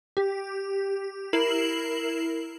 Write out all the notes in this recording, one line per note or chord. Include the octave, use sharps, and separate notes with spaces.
G4
E4 A#4 C7 E7 F#7